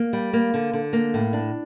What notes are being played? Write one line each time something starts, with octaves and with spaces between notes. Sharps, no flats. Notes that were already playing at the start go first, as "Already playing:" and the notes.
Already playing: A#3
G3
A#3
D3
D3
A#3
A2
D4